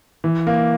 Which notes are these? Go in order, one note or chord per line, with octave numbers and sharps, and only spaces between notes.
E3
A#3